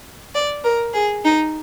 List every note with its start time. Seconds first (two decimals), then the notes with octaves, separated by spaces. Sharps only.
0.34 D5
0.63 A#4
0.93 G#4
1.24 D#4